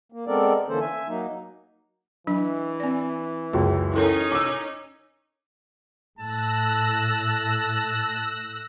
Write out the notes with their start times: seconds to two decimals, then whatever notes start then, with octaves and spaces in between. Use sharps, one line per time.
0.12 A#3
0.27 G#3 B3 C4 A4 A#4 D5
0.68 D3 E3 A#3 C#4 A4 C5
0.80 E5 G#5
1.08 F#3 A#3 D#4
2.27 E3 F#3 D4
2.80 C4 D5
3.53 C#2 F#2 G#4
3.94 C#4 D#4 E4 A4 A#4
4.32 D6 E6
6.19 A2 A5 E6 F#6 A#6